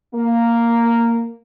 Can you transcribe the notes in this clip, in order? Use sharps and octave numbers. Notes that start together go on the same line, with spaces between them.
A#3